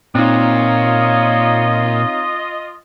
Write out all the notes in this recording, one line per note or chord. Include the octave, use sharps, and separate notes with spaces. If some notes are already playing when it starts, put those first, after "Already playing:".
A#2 C4 D#4 F4 C#5 D#5 F5 A#5